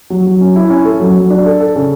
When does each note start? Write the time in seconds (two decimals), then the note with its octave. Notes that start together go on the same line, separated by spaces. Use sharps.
0.10 F#3
0.26 F#3
0.41 C#4
0.56 E4
0.70 C#4
0.85 A4
1.00 F#3
1.16 F#3
1.30 D4
1.46 A4
1.60 A4
1.76 C#3